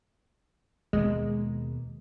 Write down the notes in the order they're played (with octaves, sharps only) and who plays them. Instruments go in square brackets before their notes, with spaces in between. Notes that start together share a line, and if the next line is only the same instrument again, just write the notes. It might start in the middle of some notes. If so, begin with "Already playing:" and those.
[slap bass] D#2 B2 A#3 [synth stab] G#3